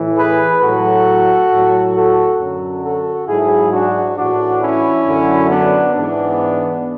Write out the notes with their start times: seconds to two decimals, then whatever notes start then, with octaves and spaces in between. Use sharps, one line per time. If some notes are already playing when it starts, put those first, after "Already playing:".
Already playing: A2 E3
0.17 G#4 B4
0.62 A2 F#3 F#4 A4
1.51 A2 F#3
1.95 F#4 A4
2.39 F#2 D3 F#3
2.83 F#4 A4
3.28 G#2 F#3 E4 G#4
3.72 D4 F#4
4.17 A2 E3 D4 F#4
4.61 C#4 E4
5.05 F#2 D3 F#3
5.50 B3 D4
5.94 G#2 E3 B3 D4